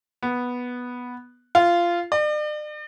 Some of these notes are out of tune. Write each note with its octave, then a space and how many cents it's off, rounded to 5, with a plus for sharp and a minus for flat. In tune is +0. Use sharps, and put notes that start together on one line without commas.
B3 -5
F4 -15
D5 +40